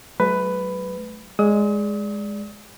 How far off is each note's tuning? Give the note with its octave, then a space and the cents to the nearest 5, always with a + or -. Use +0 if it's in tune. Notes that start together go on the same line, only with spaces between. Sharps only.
F#3 +25 A3 -35 B4 +10
G#3 +0 D5 -10 D#6 +40